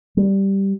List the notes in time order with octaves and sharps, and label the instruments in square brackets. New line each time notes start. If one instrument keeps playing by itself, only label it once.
[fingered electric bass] G3